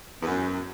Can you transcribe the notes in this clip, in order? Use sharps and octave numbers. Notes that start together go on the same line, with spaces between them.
E2
F#2